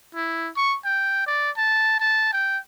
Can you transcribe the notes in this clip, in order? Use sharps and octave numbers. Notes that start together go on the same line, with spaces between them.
E4
C#6
G5
D5
A5
A5
G5